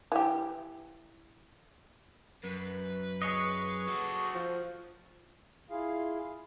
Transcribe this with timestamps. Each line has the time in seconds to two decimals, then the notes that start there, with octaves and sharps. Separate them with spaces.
0.12 E3 G4
2.44 F#2 B4
3.22 G#4 C#5 D#5 C#6
3.87 F#4 A4
4.34 F3
5.70 E4 F4 G#4 F5